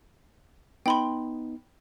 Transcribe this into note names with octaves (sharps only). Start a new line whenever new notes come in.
B3 D#4 G5 B5 C6